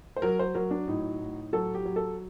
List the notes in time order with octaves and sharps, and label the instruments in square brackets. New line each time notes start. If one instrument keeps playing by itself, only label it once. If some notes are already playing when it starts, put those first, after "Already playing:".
[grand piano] C5
F#3 A#4
C5
F#3 A#4
D4
A2 D#4
A2
F#3 A4
G4
F#3
A4